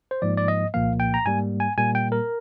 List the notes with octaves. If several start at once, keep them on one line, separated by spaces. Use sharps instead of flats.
C5
G#2 F3 A#3 D5
D5
D#5
C2 A#2 F3 A#3 F5
G5
A#5
G#2 G3 A#3 G#5
G#5
A#2 G3 A#3 G#5
G5
A#4